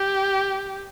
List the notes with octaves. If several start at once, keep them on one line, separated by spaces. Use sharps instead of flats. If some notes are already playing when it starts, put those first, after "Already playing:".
Already playing: G4